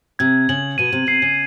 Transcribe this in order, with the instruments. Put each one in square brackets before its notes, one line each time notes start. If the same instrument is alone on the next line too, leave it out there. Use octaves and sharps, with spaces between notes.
[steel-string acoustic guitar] C3 [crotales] G#6
[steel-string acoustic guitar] C#3 [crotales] F#7
[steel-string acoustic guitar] B2 [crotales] D#7
[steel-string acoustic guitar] C3
[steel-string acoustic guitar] C3 [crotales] C7
[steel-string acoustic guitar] C#3